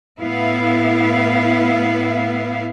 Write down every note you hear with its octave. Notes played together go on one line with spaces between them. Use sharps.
A2 B3 E4 F5